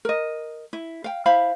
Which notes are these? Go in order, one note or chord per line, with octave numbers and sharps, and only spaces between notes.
A#4 D#5
E4
F5 G5
E4 C5 F5 B5